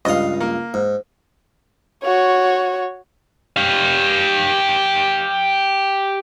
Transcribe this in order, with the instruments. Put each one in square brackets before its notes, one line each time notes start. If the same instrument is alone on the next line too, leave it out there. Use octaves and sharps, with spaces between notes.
[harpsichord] C#2 G2 D#6 [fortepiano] D#5 F5
[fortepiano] A#3
[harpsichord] G#2
[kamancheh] F#4 C#5
[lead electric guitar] G4 F5